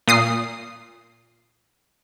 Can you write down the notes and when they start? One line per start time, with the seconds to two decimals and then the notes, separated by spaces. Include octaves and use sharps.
0.08 A#2 D#6 C7